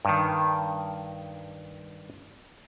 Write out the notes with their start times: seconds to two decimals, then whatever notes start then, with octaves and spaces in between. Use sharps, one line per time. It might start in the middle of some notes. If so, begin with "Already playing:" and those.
0.05 G2 D#3